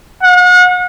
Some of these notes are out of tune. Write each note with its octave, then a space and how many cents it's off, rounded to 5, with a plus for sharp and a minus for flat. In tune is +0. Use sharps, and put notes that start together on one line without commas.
F#5 -40